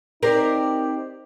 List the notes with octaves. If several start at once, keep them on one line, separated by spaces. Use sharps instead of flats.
C4 D#4 G4 A#4 C5 D5